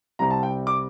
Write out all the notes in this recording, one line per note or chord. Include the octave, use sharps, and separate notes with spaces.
C2 C3 G3 C4 A#5
A5
G5
D6